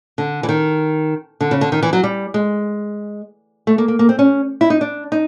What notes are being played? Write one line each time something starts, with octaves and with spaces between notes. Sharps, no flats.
D3
E3
D#3
D3
C#3
D3
D#3
E3
F#3
G3
G#3
A3
A#3
A#3
A#3
C4
C#4
E4
D#4
D4
D#4